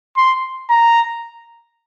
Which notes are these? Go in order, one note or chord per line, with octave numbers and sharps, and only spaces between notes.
C6
A#5